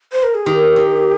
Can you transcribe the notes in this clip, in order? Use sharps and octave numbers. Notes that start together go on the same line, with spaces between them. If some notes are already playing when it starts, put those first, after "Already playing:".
C5
A#4
G#4
D#3 G4
D#3